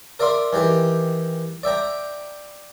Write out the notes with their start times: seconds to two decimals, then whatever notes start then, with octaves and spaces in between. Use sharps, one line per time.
0.19 A#4 D5 E5 F5 C6
0.53 D#3 E3 G4
1.63 D5 E5 G5 A#5